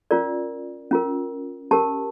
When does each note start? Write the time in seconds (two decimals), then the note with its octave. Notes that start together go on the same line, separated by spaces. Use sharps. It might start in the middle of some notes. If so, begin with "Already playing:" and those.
0.11 C#4 F4 A#4 D5
0.91 C#4 F4 A#4
1.71 C#4 G4 A#4 A5